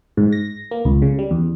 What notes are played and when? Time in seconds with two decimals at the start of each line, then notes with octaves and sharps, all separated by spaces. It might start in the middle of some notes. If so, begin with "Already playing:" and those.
0.17 G#2
0.33 A#6
0.71 A#3
0.85 C#2
1.02 C#3
1.19 G3
1.31 E2